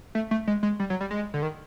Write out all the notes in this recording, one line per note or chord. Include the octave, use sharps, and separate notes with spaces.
A3
A3
G#3
G#3
G3
F#3
G3
G#3
D3
D#3